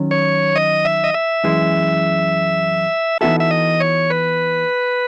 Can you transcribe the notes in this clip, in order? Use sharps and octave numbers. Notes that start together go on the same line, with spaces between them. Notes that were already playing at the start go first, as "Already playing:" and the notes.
Already playing: D#3 F#3 C#4
C#5
D#5
E5
D#5
E5
F#2 E3 G#3
E3 B3 D#4 F#4 A4 E5
E5
D#5
C#5
B4